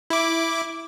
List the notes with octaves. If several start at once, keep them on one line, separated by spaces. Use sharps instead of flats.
E4 D6